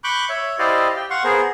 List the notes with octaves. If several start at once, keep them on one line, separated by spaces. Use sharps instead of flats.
B5 C#6 D6 F#6 G6
C#5 E5
E4 G4 C5 D5 D#5 F5
G4 G5
F5 F#5 C6 C#6
B3 G#4 A#4 C5